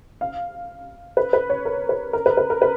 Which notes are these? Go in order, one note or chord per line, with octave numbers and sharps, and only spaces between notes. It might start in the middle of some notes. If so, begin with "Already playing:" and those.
F5
B4
B4
C#5
A#4
B4
A#4
B4
B4
A#4
B4